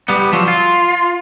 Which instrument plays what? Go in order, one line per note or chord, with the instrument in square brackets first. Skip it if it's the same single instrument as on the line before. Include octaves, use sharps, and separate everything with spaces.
[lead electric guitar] G3 B3
F3 F#3
F4